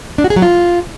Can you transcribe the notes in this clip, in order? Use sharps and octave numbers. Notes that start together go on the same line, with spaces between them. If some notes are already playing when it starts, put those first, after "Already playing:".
D4
F#4
G#4
F#3
F4